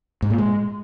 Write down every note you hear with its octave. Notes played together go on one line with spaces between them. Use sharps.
G#2
A#2
G#3